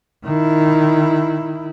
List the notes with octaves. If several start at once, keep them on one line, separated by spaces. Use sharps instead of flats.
D#3 E4